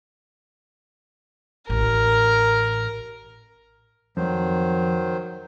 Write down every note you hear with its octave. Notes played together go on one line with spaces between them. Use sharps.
A1 A#4
F2 D#3 F#3 C5